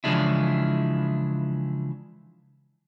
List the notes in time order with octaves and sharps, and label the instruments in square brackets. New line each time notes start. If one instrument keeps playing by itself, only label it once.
[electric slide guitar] C#3 E3 F3 G#3 D4 E4